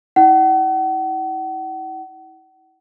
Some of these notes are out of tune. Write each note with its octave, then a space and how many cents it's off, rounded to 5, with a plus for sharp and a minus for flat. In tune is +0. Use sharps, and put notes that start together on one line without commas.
E4 -35 F#5 +40